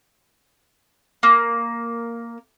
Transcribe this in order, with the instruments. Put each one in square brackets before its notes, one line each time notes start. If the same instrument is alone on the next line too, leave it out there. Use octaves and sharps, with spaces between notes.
[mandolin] A#3